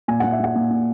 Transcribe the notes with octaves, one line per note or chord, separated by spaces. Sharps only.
A#2 G#5
A#2 F#5
E5
A#2 F#5
A#2
A#2